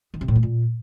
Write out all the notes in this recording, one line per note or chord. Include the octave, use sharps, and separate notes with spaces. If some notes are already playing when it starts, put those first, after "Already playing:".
D#3
C3
A2
A3
A#2